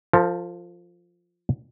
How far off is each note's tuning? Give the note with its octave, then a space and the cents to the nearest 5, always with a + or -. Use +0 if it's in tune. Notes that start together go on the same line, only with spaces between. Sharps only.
F3 +0 A4 +40